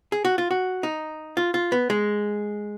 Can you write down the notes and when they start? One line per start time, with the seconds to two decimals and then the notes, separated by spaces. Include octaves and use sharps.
0.12 G#4
0.25 F#4
0.38 F4
0.51 F#4
0.83 D#4
1.37 F4
1.54 F4
1.72 B3
1.90 G#3